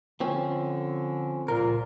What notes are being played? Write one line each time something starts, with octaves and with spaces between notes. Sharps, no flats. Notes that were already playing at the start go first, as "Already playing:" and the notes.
D3 F3 C4 C#4
C#2 A#2 F3 A#4